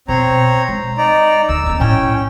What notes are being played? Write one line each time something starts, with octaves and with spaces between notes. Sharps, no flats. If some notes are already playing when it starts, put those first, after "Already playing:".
B2 C4 C#5 A#5
G#3
D#4 D5 A#5
D2 E6
A#3 C4
A2 C#4 E4 G5